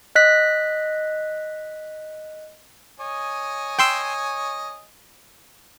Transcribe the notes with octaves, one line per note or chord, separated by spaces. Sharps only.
D#5 F#6 B6
C#5 D#5 G#5
G5 C6 E6